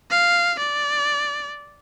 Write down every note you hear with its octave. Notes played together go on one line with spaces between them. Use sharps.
F5
D5